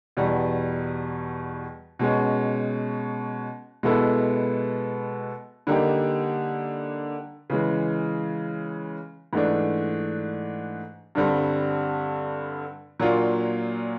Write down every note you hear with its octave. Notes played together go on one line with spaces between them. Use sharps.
E2 B2 G3
B2 G#3 C#4
B2 G#3 B3 E4 A4
D3 G3 A#3 D#4 G4
C#3 E3 G#3
G#2 E3 A3 D4
G2 D3 G3 C4
A#2 F#3 A#3 D4 F4